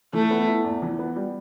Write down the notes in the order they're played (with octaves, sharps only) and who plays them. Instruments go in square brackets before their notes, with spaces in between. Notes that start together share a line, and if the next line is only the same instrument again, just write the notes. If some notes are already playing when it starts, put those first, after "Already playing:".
[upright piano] E3 [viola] A3
[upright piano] B3
E4
E2
E3
B3
G3